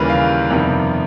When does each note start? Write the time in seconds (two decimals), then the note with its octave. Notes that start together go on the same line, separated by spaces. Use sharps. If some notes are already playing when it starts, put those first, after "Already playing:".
Already playing: D#2 C#3 E3 G3 A#3 A#4 B4
0.10 F5
0.50 F2 C3 D#3 G3 B3